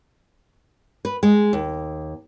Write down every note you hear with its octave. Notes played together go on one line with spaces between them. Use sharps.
B4
G#3
D#2